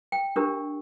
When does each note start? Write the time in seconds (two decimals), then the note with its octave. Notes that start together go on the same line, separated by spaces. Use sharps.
0.12 G5
0.36 D4 G4 A#4